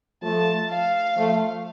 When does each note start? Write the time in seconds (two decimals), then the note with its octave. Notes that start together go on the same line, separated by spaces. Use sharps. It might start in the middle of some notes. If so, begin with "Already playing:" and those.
0.23 F3 A3 A5
0.70 F5
1.17 F3 A3